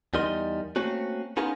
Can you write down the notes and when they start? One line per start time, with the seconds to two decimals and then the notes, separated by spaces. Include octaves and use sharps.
0.14 E2 G3 D#4 A#4 D#5 C6
0.76 A3 A#3 C4 C#4 F#4
1.37 B3 C#4 D#4 F4 G#4 A#4